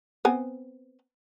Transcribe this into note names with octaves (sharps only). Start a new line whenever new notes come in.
B3 C4 G#5